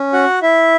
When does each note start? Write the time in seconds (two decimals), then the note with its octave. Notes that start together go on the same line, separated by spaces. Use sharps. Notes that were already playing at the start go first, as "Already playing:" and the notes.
Already playing: C#4
0.13 F#4 F#5
0.42 E4 E5